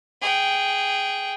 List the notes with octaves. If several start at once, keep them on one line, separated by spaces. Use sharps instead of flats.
G#4 G5